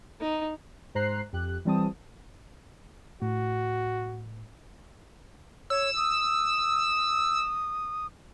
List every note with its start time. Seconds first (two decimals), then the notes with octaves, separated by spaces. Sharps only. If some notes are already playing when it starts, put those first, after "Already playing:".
0.20 D#4
0.95 G#2 C5 A#5 F#6 C7
1.33 F2 G4 F#6
1.65 E3 G3 C4 A5 D#6
3.22 A2 F#4
5.70 C#5 E6
5.97 D#6